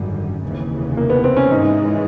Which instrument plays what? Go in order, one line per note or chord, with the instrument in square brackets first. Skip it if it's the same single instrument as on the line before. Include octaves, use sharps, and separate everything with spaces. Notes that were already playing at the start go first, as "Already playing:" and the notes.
Already playing: [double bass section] G#1 F#2 D3 G3
F1 D#2 C#3 E3
[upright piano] A#3
B3
C4
C#4
[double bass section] G#2 E3 G#3 [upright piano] D#4